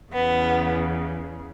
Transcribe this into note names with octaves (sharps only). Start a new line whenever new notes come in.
E2 C#3 E3 B3